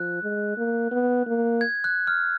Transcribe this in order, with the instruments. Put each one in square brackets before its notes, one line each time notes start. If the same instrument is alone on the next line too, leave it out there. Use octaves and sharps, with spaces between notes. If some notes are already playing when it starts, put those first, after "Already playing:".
Already playing: [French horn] F3 [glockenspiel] F#6
[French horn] G#3
A#3
B3
A#3
[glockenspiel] G#6
F#6
F6